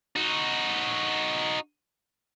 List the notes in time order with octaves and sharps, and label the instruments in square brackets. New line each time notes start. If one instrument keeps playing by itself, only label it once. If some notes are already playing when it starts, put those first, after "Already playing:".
[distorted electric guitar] D#4 F#4